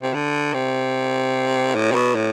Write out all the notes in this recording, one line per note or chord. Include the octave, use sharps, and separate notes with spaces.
C3
D3
C3
A2
C3
B2
A2